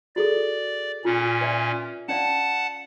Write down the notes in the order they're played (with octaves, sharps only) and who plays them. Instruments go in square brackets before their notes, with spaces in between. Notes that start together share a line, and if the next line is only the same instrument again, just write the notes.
[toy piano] F#4 G#4 A4 [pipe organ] D5
[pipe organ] A#2 C#4 [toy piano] F4
[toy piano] B4 D5 E5
[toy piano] C#4 D5 F5 [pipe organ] F#5 A5